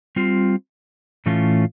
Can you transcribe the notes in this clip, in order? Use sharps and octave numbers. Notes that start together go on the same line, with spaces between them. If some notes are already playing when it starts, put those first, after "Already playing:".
G3 C4 F4
A2 E3 A3 C#4 F4